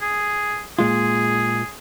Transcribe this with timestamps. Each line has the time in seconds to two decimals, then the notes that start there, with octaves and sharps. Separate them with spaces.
0.01 G#4
0.79 A#2 G#3 F4 G#4